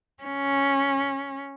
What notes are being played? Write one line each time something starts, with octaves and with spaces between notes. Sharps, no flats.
C#4